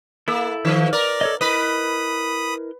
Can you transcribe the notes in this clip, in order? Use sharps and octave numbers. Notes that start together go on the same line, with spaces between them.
A#3 E4 A4 E6
D#3 F3
A#4 D5
A4 C#5 D#5
E4 A#4 B4 D#5 B5 D#6